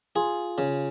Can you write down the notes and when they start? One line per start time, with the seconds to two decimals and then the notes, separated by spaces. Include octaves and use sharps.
0.15 F4 G#4
0.58 C#3